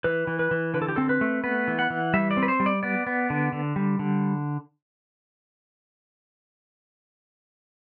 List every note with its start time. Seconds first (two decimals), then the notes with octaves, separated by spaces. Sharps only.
0.04 E3 B4
0.27 E3
0.39 B4
0.51 E3
0.74 D3 B4
0.82 A4
0.88 G4
0.96 C4 A4
1.09 B4
1.21 A3
1.44 B3 B4
1.68 E3
1.79 F#5
1.90 E3
2.14 G3 E5
2.31 D5
2.37 C4
2.43 B4
2.48 C5
2.60 G3
2.66 D5
2.83 B3 D5
3.07 B3
3.30 D3
3.53 D3
3.76 G3
3.99 D3